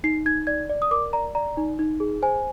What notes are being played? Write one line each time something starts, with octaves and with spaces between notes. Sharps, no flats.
D#4 C7
D#4 G#6
D5 G#6
D5
D#6
A#4 D6
D5 A#5
D5 A#5
D#4
D#4
G#4
C5 G#5